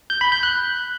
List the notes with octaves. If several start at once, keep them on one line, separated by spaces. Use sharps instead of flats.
G6
B5
G6
F#6